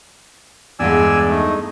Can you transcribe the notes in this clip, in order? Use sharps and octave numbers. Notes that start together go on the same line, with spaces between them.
E2 G2 G#3 D5 G#5 E6
A3 D#4